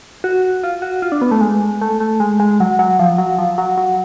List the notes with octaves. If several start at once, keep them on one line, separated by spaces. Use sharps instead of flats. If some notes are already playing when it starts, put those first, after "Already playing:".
F#4
F4
F#4
F4
D4
B3
A3
G#3
A3
A3
G#3
G#3
F#3
F#3
F3
F#3
F3
F#3
F#3